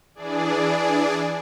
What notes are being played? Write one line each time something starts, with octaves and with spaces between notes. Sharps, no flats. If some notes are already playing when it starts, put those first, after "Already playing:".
E3 D4 G#4 D5